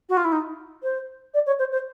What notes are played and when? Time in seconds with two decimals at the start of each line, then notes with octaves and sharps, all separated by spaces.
0.09 F#4
0.17 F4
0.24 E4
0.32 D#4
0.83 C5
1.34 D5
1.46 C#5
1.59 C5
1.72 C5